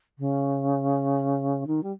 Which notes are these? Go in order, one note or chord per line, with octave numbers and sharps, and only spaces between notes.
C#3
D#3
G3